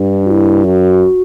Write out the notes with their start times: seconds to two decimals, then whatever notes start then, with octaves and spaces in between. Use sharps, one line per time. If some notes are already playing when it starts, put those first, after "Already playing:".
Already playing: G2 D4
0.26 F#4
0.31 E4
0.64 F#2 F#4